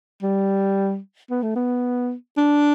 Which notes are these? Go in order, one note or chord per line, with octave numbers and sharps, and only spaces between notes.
G3
B3
A3
B3
D4